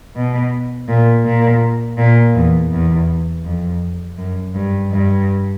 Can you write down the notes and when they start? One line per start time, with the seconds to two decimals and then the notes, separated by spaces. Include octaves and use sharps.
0.15 B2
0.88 A#2
1.25 A#2
1.98 A#2
2.36 E2
2.72 E2
3.45 F2
4.18 F#2
4.55 G2
4.92 G2